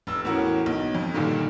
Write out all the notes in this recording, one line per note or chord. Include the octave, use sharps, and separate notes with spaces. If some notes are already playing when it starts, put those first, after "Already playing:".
F1 E6
E2 A2 C#4 F#4 A#4
B1
F2
G2 A#2 D3 D#3